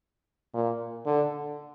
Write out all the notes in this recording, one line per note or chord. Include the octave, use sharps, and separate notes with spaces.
A#2
D3